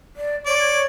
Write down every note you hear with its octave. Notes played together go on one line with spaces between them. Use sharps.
D5
C#5 D5